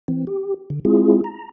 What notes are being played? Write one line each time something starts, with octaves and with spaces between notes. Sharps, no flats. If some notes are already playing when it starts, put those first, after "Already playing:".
E3 C4
G4
D3
G#3 C4 E4 F4 G#4
A#5